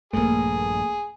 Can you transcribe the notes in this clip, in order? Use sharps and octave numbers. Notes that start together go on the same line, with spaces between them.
A#1 G2 A3 A#3 G#4